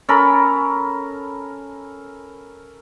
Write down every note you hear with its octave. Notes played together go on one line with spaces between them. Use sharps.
C#4 A4 A#4 B5